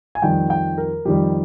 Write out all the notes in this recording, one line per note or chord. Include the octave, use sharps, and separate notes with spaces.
G#5
F2 D#3 G3 G5
G5
A#4
F2 D#3 G3 G4